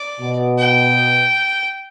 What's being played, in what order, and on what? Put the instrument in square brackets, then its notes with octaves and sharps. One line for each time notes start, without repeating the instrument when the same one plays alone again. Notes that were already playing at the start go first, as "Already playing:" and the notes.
Already playing: [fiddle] D5
[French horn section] B2
[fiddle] G5